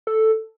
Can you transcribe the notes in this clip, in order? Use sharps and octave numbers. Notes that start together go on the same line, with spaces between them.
A4